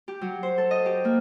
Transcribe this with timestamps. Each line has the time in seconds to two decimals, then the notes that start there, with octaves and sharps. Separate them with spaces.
0.08 G4
0.21 F#3
0.43 C5
0.58 A4
0.71 D#5
0.86 G4
1.05 A#3